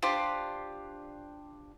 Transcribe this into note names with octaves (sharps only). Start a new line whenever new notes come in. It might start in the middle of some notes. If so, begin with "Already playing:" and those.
D4 F4 G4 C5